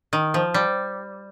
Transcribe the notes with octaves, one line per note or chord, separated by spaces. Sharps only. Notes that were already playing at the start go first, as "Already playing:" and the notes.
D#3
F3
G3